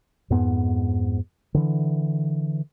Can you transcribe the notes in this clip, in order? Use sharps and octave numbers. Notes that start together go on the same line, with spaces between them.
F2 G#2 B3
D3 E3